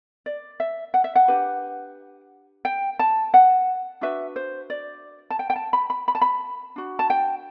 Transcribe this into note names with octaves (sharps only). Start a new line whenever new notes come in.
D5
E5
F#5
E5
F#5
D4 G4 B4
G5
A5
F#5
D4 F#4 B4 E5
C5
D5
A5
G5
G5
A5
B5
B5
B5
A5
B5
D4 F#4
A5
G5